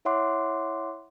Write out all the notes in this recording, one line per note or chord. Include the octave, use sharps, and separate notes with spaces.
E4 C#5 E5 F#5 C6 D6